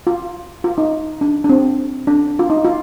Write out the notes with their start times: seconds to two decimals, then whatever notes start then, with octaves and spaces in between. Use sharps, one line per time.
0.07 F4
0.64 F4
0.78 D#4
1.21 D4
1.44 D4
1.49 C4
2.07 D4
2.39 F4
2.50 D#4
2.65 F4